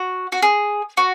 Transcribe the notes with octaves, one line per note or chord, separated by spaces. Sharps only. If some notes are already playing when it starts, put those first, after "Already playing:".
Already playing: F#4
F#4
G#4
F#4